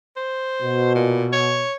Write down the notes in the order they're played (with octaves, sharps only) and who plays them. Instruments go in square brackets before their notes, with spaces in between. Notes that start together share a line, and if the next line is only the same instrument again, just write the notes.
[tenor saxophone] C5
[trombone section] B2
[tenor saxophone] A#2
C#5